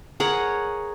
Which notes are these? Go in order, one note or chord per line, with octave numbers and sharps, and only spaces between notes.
G#4 A#4 C#5 F#5